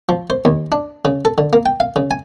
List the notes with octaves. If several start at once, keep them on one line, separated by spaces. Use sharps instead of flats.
F3
C5
D#2
D4
C#3
A4
D3
A#3
G5
F5
C#3
G#5